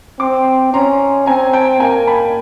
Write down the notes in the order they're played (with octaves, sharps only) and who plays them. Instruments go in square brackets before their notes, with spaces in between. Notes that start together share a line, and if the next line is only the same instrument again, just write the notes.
[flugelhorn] C4 [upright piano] C6 D6
[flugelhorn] C#4 [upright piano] A#5 C6
[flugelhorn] C4 [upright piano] G#5 A#5
[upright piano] G5 A5
[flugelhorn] A#3 [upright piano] G#5 A#5
[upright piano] A5 B5